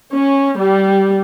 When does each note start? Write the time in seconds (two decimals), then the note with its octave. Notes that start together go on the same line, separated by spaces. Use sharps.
0.12 C#4
0.58 G3